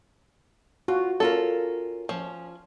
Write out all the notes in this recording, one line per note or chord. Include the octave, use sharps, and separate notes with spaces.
F4 F#4
C#4 F4 A4 A#4
F3 C#4